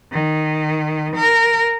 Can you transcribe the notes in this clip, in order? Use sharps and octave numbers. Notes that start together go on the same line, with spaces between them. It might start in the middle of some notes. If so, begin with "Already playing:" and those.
D#3
A#4